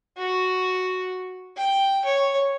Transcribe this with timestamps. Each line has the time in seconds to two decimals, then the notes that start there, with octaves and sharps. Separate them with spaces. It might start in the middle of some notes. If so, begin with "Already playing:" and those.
0.18 F#4
1.57 G5
2.05 C#5